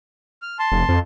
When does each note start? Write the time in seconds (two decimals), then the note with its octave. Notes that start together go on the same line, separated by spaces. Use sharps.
0.42 F6
0.59 A5 C6
0.72 F1
0.89 F2